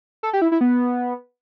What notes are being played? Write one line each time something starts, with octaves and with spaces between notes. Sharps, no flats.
A4
G4
E4
E4
B3